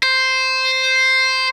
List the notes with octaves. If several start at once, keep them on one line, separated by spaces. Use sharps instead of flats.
C5